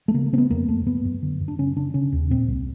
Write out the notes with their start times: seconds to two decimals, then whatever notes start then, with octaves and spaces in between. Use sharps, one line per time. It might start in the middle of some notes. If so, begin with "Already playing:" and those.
0.08 A3
0.14 C#3 A#3
0.26 A#3
0.33 C#3 C4
0.38 B3
0.50 F2 A#3
0.68 F2 A3
0.86 F#2 B3
1.05 F#2
1.22 D3
1.40 F#2
1.48 D4
1.59 C#3 C#4
1.76 C#3 D4
1.94 C#3 C#4
2.12 D#2
2.30 A#2 C4
2.48 C2